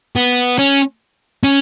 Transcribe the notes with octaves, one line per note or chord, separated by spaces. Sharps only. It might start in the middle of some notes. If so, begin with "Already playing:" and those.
B3
C#4
C#4